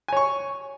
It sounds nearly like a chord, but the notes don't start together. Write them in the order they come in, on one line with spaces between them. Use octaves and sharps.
G#5 C#5 C#6